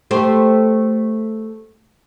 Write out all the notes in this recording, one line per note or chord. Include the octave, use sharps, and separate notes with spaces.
A3 G4 C5